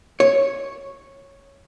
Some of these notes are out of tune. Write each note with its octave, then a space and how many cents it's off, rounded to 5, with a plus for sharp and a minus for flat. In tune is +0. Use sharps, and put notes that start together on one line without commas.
C#5 -5